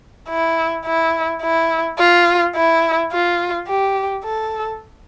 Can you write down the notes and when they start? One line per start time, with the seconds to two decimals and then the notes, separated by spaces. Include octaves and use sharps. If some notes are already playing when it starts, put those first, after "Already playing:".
0.29 E4
0.85 E4
1.42 E4
1.99 F4
2.56 E4
3.13 F4
3.68 G4
4.25 A4